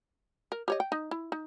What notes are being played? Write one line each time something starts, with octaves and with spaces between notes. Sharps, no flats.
A#4
G4 C#5 D#5
G5
D#4
E4
D#4